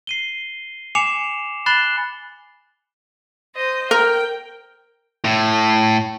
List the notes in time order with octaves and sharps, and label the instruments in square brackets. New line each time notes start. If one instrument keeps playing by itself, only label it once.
[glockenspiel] C7 D#7 G7
G#5 D6 C7 C#7 E7 F7
B5 F#6 A6 C7 E7 G7
[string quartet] C5 D#5
[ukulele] A#4 [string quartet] G5
[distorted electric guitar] A2